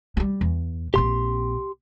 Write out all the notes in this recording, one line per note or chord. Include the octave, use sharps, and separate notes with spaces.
F#3 G3
E2
A#1 C4 G4 C6